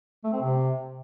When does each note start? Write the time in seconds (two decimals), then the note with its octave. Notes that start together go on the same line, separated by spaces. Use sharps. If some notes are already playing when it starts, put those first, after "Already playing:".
0.24 A3
0.33 C4
0.42 C3